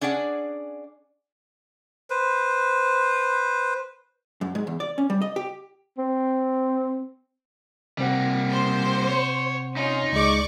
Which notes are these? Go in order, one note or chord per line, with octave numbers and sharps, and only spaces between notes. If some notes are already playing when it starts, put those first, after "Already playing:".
C#4 D4 G#4 D5 F#5
B4 C5
F#2
G#2
E2
D5
C#4
G3
D#5
G4
C4
C3 G3 A#3 C4 F#5
C5
C#5
C#4 D#4 F4
C#2 G#3 D5 C#6 D6